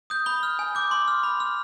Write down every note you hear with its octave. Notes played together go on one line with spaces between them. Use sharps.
D#6 G6
B5 G7
F6
G#5
D6 G6
C6
F6
B5
F6